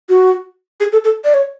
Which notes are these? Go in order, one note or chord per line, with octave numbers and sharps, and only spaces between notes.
F#4
G#4
A4
A4
D5
C#5